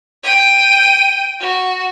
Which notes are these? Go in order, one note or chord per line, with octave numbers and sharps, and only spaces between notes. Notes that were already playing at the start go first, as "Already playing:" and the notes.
G5 D#7
F#4